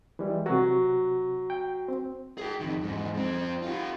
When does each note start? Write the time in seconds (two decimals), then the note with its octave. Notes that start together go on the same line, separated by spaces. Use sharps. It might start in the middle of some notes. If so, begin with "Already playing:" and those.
0.19 E3 G3 G#3
0.46 C3 F#3 F#4
1.50 G5
1.88 C4
2.38 G#4 G5
2.60 F2 D#3
2.80 E2 G#2
3.14 F2 C4
3.62 F4 G4